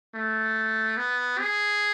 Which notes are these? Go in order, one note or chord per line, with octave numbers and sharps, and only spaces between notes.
A3
B3
G#4